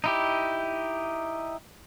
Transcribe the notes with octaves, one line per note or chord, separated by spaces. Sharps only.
D#4 E4 G4